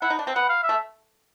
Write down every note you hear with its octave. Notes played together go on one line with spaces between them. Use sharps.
E4 F#5
D#4
D4
C4
B3 F#5
F5
E5
A3